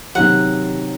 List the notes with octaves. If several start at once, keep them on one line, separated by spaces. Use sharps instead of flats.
C3 D#3 F#3 F#5